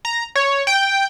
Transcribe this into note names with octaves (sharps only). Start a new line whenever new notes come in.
A#5
C#5
G5